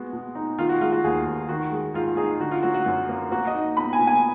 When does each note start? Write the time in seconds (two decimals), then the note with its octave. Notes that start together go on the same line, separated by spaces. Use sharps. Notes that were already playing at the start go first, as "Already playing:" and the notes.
Already playing: G#3 B3 F#4
0.13 B2
0.35 D#4
0.59 D#3 F4
0.69 F#4
0.80 G#3 F4
0.92 F#4
1.04 D#2 G#4
1.27 D#2
1.49 D#3 F#4
1.71 G#3
1.94 G#2 F4
2.17 D#4 G#4
2.40 D3 F#4
2.51 F4
2.63 F#3 F#4
2.74 F#4
2.86 F#2
3.09 A#3
3.32 A#3 F#4
3.47 D#5
3.54 D#4
3.77 B2 B5
3.93 G#5
3.99 B2
4.07 G#5